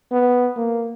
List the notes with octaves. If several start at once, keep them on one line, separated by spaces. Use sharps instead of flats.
B3
A#3